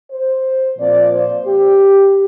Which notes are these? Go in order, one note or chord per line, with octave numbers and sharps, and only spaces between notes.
C5
A#2 F3 C4 D5
C5
G4